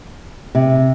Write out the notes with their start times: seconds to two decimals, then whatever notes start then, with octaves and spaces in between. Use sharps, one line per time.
0.55 C3